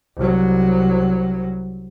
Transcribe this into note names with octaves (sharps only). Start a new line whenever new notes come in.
C2 F#3